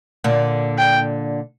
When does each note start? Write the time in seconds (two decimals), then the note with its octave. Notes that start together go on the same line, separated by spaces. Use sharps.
0.24 A#2 D3
0.78 G5